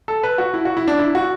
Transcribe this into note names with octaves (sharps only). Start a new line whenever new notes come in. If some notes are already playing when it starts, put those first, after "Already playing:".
A4
B4
F#4
E4
F#4
E4
D4
E4
F#4